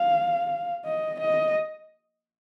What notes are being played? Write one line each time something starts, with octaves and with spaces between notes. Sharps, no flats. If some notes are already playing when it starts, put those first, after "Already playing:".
Already playing: F5
D#5
D#5